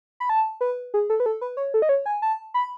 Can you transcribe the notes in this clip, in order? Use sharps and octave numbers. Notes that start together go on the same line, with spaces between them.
B5
A5
B4
G#4
A4
B4
A4
B4
C#5
A4
D#5
C#5
G#5
A5
B5